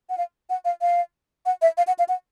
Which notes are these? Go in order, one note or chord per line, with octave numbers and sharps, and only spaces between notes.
F#5
F5
F#5
F5
F5
F#5
E5
F5
F#5
F5
F#5